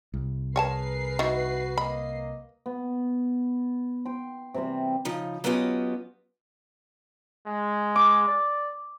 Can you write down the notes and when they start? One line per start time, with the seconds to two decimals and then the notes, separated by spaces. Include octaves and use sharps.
0.14 C2
0.56 G#4 A#4 B4 C#5 G#5 A5 C7
1.19 D#3 E4 F#4
1.78 A#3 D#5 B5
2.66 B3
4.06 G5 C6
4.54 C3 E3 G3 C4
5.05 C#3 F3 D#4
5.44 F#3 B3 C#4 F4 G4 D#5
7.46 G#3
7.96 D6
8.28 D5